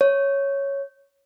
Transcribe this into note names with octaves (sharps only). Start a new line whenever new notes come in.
C#5